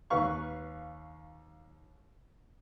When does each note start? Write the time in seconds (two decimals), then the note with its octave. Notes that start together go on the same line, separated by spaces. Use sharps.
0.10 D#2 B4 F5 C#6